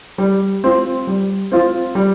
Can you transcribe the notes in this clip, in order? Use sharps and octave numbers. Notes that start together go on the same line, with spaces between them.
G3
C4 F4
G3
C4 F4
G3